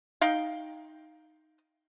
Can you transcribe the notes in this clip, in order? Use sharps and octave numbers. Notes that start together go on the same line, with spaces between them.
D#4 F5 G5